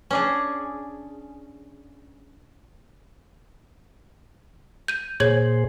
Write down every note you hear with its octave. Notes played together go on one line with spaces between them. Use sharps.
C#4 D4 G#4
G6 D#7
A#2 G#4 C5 C#5 G#6 F#7